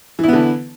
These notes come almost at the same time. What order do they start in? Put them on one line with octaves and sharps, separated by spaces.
E3 E4 B3 D3